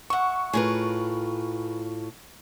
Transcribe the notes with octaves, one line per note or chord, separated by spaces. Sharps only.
E5 F#5 C#6
A2 F4 G#4 A#4 B4